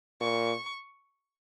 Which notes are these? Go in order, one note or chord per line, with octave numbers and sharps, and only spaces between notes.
A#2 C#6